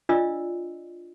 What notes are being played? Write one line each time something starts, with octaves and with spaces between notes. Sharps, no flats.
D4 F4 D5 D#5 E6